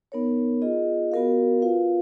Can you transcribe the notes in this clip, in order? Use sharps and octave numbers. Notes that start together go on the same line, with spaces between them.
B3 D#4 A#4 C#5
F4 G#4 D#5
B3 F#4 A#4 F5
F4 B4 F5